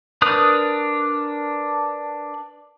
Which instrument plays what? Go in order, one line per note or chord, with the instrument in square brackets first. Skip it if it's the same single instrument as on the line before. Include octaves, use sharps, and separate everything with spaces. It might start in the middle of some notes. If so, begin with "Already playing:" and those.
[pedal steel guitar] D4 A#4 B4 D#6 F#6